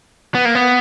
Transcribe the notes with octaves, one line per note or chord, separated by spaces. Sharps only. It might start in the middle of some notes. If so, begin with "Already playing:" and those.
B3
A#3
B3